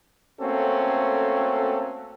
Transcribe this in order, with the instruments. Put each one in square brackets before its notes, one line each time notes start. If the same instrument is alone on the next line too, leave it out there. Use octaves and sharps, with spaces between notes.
[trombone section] A3 A#3 C4 C#4 F#4 A4